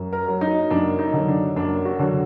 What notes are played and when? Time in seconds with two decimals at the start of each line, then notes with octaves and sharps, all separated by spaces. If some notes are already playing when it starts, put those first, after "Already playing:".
Already playing: F#2
0.13 A#4
0.28 F#3
0.41 D#4
0.70 F#2 D4
0.99 D#4
1.13 D3 F#3
1.28 D4
1.56 F#2 D4
1.85 F#4
1.99 D3 F#3